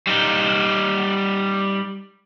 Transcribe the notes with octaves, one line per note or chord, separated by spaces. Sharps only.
G3 D#4